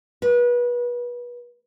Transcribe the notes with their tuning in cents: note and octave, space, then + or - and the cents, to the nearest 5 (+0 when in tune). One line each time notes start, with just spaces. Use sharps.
B4 -30